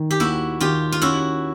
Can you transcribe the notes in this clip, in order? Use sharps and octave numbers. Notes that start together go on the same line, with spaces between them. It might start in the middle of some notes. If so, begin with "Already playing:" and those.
Already playing: D#3
G4
D#2 E4 F#4
D#3 F4 G4
F4
C#4 E4 F#4